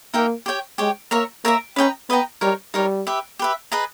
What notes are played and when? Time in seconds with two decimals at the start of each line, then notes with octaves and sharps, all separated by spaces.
0.14 A#3 D#4 A#4 E5 G5
0.46 G4 C#5 G5
0.78 G#3 G4 C#5 G5
1.11 A#3 A#4 C#5 E5 A#5
1.44 A#3 A#4 C#5 E5 A#5
1.76 C#4 B4 D#5 G5 A#5
2.09 B3 B4 D#5 G5 A#5
2.41 G3 D#4 A#4 C#5
2.74 G3 D#4 A#4 C#5
3.07 G4 B4 E5
3.39 G4 B4 E5
3.72 G#4 B4 D#5 A#5